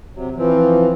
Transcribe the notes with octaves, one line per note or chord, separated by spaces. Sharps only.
C3 F#3
E3 F3 C4